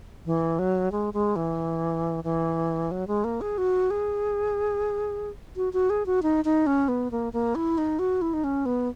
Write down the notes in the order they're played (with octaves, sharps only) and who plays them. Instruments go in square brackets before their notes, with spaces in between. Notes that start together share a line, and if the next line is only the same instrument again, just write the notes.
[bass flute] E3
F#3
G#3
G#3
E3
E3
F#3
G#3
A#3
G#4
F#4
G#4
F#4
F#4
G#4
F#4
D#4
D#4
C#4
B3
A#3
A#3
E4
D#4
F#4
E4
D#4
C#4
B3